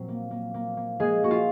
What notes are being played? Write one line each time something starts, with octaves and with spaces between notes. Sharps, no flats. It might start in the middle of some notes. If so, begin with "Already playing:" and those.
Already playing: A#2 F#3 C4
A#3
A#3
A#3
A#3
G#3 A#3 G#4
A#3 F#4
F4